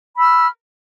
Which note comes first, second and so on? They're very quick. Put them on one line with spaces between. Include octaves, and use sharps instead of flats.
B5 E6 F6